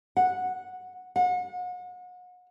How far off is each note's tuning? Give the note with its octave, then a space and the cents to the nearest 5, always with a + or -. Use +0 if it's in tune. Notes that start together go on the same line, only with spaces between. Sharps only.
F#5 -10
F#5 -35